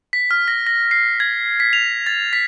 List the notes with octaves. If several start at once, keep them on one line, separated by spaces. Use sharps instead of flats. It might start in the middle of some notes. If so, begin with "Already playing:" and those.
B6
F6
A#6
A#6
C7
G#6
B6
F7
A6
B6